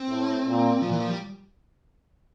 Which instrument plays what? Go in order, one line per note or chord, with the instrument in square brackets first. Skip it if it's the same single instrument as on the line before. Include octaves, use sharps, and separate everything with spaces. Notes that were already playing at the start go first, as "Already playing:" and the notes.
Already playing: [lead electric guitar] C4
[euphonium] A2
A#2
[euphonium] A#2 [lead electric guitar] F3
[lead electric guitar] E3
F3
G3